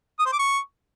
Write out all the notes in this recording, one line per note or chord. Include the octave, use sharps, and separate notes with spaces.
D#6
C5
D6
C#6